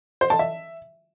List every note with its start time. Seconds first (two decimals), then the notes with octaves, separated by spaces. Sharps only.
0.21 C5
0.30 A5
0.39 E5